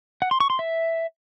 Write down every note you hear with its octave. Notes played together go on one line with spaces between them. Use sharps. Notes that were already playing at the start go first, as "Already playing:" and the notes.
F#5
C6
C#6
C6
E5